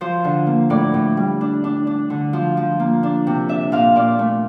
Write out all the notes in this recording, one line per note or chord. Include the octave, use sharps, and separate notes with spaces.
F3 C5
D3
A#3
A2 D5
A2
G3
D4
D4
D4
D3
F3
F3
A#3
D4
C3
D4 E5
A#2 F5
A#2 D5
A3